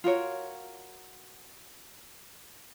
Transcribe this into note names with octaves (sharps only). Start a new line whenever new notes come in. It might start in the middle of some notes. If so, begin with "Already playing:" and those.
F4 F#4 A#4 C#5